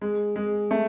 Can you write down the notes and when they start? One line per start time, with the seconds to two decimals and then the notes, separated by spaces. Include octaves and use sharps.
0.01 G#3
0.36 G#3
0.71 A3